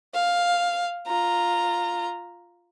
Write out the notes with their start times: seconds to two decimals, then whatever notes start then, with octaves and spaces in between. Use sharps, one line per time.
0.14 F5
1.07 F4 A#5